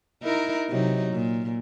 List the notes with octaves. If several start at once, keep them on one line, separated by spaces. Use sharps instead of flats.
D#4 E4 A#4
C3 F#3 D#4
A#2